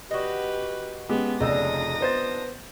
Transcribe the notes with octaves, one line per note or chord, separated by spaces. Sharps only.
F#4 G4 B4 D#5
G#3 B3 C#4 G4
F1 C#3 D4 D#4 F4 D#6 E6 A#6
B3 C5 A6